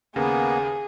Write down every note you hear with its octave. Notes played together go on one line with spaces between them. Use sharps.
D#2 C#3 A#3 B3 G#4